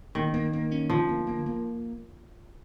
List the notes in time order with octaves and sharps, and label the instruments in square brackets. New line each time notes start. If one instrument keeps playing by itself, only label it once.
[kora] D#3 [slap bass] A#3
[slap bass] A#3
A#3
C#4
[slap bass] D3 [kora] F3
[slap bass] A#3
A#3
A#3